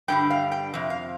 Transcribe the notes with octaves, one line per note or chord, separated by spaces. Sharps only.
G2 D3 G3 G5
F5
G5
F2 C3
F5